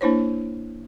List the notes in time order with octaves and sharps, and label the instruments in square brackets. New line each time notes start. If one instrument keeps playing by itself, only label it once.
[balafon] A#3 D4 E4 C5 C#5